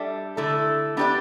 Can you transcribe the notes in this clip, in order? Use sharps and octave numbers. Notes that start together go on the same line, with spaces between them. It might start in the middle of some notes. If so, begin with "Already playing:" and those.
Already playing: G3 D4 A4 E5
D3 A3 E4 A4
B3 D4 G4 B4 D5